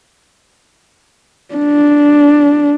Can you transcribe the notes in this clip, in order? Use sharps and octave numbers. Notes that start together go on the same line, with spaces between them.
D4